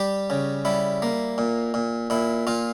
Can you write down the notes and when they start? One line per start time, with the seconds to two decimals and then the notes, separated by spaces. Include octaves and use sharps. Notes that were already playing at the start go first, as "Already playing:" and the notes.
Already playing: G3 G4
0.30 C#3
0.65 G3 E4
1.02 A#3
1.38 A#2
1.74 A#2
2.10 A#2 E4
2.47 A#2 F4